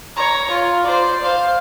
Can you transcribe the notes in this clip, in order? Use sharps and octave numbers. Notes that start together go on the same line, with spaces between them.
C#5 A#5
F4
C5 D5
C5 F5